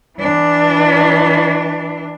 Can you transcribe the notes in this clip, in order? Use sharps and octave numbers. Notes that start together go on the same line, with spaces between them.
E3 D4